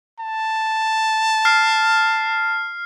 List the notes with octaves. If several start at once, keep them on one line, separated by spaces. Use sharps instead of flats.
A5
F6 C7